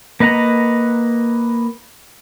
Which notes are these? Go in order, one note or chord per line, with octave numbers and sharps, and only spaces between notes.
A#3 B4 D#5 F#5 A#5